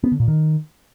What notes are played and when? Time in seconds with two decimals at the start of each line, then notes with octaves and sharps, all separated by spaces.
0.04 B3
0.12 D3
0.20 A#2
0.28 D#3